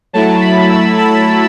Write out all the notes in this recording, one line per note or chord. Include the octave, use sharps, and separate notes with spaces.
F#3 A3 E4 A5
B5
E6
A5